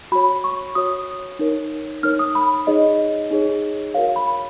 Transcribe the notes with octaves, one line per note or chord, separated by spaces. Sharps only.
F#4 C#5 B5
C#6
F#4 C#5 D#6
D#4 A#4 C#5
D#4 A#4 C#5 F6
D#6
B5
D#4 G#4 C#5 D#5
D#4 G#4 C#5
F#4 A#4 C#5 F5
B5